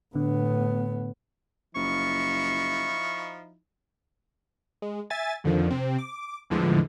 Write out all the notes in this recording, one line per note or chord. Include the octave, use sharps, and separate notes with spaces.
A2 D3 B3
F#1 F3 D#4 E4 C#6
G#3
E5 G#5 A6
F2 D3 D#3 F3
C3 C4
D6
E2 A2 D3 E3 F3 G#3